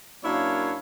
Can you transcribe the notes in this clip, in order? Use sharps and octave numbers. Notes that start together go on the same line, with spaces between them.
F#2 A#3 D4 E4 C#5 F5